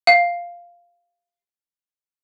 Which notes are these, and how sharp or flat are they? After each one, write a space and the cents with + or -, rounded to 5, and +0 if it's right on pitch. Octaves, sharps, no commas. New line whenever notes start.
F5 -5